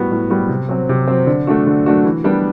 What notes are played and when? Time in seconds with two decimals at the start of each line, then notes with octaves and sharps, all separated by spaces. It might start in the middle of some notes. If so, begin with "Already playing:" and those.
Already playing: A2 G3 B3 F#4
0.11 A2
0.30 G3 B3 F#4
0.49 C3
0.69 F#3 C4
0.89 C3
1.08 F#3 C4
1.27 D3
1.47 A3 D4 F#4
1.67 D3
1.86 A3 D4 F#4
2.05 E3
2.24 G3 B3 D4